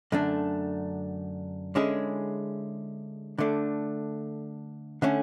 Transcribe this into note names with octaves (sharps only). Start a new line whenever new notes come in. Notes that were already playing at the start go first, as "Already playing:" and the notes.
F#2 D3 A3 D4
D3 G#3 C#4 E4 G#4
D3 A3 D4
D3 A3 C#4